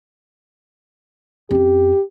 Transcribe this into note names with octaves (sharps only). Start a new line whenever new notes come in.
F2 C#4 G4